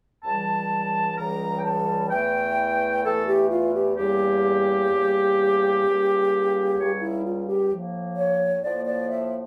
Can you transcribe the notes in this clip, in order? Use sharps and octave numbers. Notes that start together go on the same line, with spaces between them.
C#2 C#3 E3 G3 A5
C#2 C#3 E3 G3 A#5
G5
A5
E2 E3 A3 G5
E2 E3 A3 A4
G4
F4
G4
E2 C#3 G3 A#3 G4
E2 C#3 G3 A#3
C#2 C#3 G3 A#3
C#2 C#3 G3 A#3 C#5
E4
F4
G4
A2 F3 A#3
C#5
A2 F3 A#3 D5
D5
E5